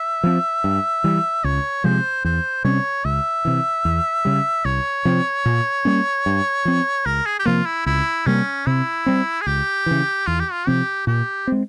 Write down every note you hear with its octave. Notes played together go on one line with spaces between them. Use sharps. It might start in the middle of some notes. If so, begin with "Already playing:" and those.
Already playing: E5
F3 C4
G2
E3 G3
C#2 C#5
C3 F3 G#3 C5
E2 C5
C3 G3 C#4 C#5
C#2 E5
C3 E3
E2
C#3 G3
C2 C#5
C3 F3 C4
A#2
G3 A#3 C#4
G2
F3 C4
C#2 A#4
G#4
G4
C3 F3 A#3 F4
E4
C#2 E4
C3 G3 A#3 C#4
C3 E4
G3 C4
G#4
C#2 G4
C#3 E3
E2 F4
G4
F4
C3 F3 C4 G4
A#2 G4
G#3 C4